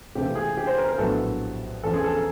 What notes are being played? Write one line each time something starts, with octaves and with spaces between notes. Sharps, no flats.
C#2 C3 E3 A3 C4 G4
G#4
G4
C5
A#4
A#4
A#1 A2 F#3 B3 A4
E2 C#3 F3 A4
G#4
A4
A#4